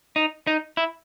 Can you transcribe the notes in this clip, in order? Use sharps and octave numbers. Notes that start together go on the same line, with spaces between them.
D#4
D#4
E4